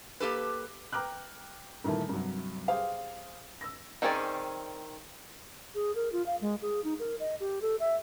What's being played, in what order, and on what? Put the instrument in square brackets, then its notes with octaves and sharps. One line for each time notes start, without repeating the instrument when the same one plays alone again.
[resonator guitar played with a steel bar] A#3 G4 A4 B4
[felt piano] G5 A#5 D6 F6 F#6
G2 A#2 D#3 E3 A3
G2 C3 F#3
G4 G#4 C5 F5
E6 A#6
[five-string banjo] D#3 C4 C#4 G#4 D5
[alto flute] G#4
A#4
F4
F5
G#3
G#4
D#4
A#4
D#5
G4
A4
E5